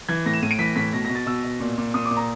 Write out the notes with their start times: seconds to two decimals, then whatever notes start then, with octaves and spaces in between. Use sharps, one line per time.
0.09 E3 G#6
0.26 A2 A#6
0.33 E7
0.42 A2 D#7
0.51 D7
0.59 E3 B6
0.76 A2 B6
0.93 B2 A#6
1.05 B2 A#6
1.15 A6
1.26 B2 E6
1.44 B2
1.60 A#2
1.78 A#2
1.94 A#2 D#6
2.06 D6
2.11 A#2
2.17 A#5